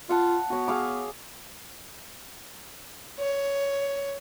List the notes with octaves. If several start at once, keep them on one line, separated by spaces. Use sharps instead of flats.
F4 F5 F#5 A5
B3 F#4 C#5
G#4 F5 D6
C#5